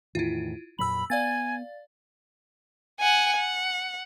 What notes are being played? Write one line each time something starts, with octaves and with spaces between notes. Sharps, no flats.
E2 A2 D#3 E4 F4
F2 A#2 F#3 B5 E6 F#7
B3 D5 F5 G#5 A6
F#5 G#5
F#5